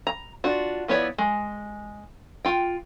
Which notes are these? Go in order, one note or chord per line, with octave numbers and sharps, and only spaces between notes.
A#5
D4 F4 F#4
F3 B3 E4 C#5 D5
G#3
F4 G5